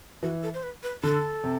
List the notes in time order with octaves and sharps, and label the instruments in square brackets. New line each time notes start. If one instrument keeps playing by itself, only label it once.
[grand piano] E3 [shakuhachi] F#4
[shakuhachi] A4
C5
B4
B4
[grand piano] D3 [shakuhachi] A4
[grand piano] C3